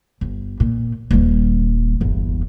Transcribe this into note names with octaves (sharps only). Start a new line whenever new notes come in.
G1
A#2
D#1 G3
G1 E2